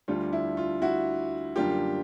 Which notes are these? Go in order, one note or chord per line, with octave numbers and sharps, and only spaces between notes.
D2 D3 G3 F4
E4
F4
E4 F#4
F#2 D3 G3 A#3 F4 G4